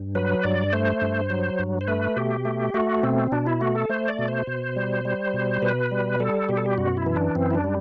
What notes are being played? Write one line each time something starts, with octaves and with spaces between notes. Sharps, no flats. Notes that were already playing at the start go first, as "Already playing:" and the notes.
Already playing: G2
F#3 B4
G2 D5
A3 C5
G2
F#3
G2
C5
A3 B4
B2 G4
A3
A3 F#4
B2 C4
B2 D4
E4
A3 F#4
A4
A3 C5
D5
B2
C5
B2
G3
G3
B2
B2 B4
G3
G3 A4
B2 G4
A4
G4
F#2 F#4
E4
E3
D4
F#2 C4
E4
D4
G3